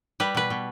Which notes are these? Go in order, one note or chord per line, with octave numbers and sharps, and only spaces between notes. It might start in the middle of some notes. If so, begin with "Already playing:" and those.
G3 B4
B2 B4
B2